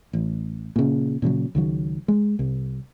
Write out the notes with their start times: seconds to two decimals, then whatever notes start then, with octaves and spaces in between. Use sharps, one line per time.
0.13 A1
0.76 A#2 C#3
1.22 A#2 C#3 F3 F#3
1.55 C#2 D#3 F#3
2.08 G#3
2.39 C2